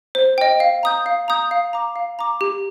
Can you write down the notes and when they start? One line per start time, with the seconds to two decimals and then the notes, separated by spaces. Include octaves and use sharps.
0.15 C5
0.38 D#5 G5
0.60 F5
0.83 A#5 D#6 G6
1.06 F5
1.28 A#5 D#6 G6
1.51 F5
1.73 A#5 D6
1.96 F5
2.19 A#5 D6
2.41 G4